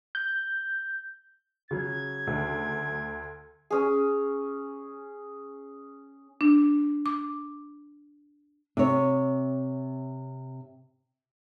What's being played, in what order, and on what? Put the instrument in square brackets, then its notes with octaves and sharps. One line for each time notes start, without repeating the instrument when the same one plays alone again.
[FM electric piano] G6
[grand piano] C#3 F#3 [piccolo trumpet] G#6
[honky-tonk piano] D2
[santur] C#4 G#4
[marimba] D4
D6
[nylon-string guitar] C3 C#5